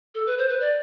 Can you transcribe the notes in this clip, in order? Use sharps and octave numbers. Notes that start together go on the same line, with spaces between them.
A4
B4
C5
B4
D5